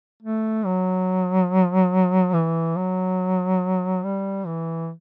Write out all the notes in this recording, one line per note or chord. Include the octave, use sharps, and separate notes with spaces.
A3
F#3
E3
F#3
G3
E3